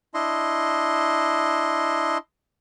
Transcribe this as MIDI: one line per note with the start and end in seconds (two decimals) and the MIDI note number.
0.14 2.18 62
0.14 2.18 64
0.14 2.18 75
0.14 2.18 84